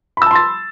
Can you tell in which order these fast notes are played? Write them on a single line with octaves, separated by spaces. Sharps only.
B5 E6 A5 C6 A6